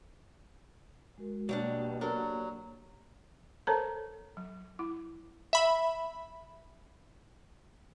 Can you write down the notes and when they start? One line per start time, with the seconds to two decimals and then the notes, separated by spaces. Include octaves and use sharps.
1.18 G#3 F#4 A#4
1.49 B2 F#3 G3 A#3 D4 G4 D5
2.01 F#3 D4 A4 A#4
3.67 A4 A#4 C5 C#5 A5 A#5
4.37 F#3
4.79 E4
5.53 E5 B5